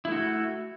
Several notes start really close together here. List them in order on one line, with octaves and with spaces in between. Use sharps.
E4 A3 F#4